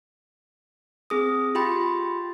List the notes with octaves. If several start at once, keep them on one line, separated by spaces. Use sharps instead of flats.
C4 G#4 D#6
F4 G4 G5 B5 C6 A6